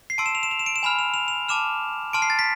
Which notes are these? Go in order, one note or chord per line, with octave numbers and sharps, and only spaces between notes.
C7
A5 C6 E6 D7
E7
F7
E7
F7
E7
D7
E7
G#5 B5 F6 F7
F7
F7
F7
A5 D6 F6 E7
A5 C6 F6 D7
C7
A6
B6